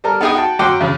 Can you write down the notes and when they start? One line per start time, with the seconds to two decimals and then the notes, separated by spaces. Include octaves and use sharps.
0.04 G3 A4 A#4
0.21 B3 D#4 G#4 G5 D#6
0.35 F#4 G5 A5
0.59 F#2 F#3 F#5 G5 C6 D6
0.81 E2 C#3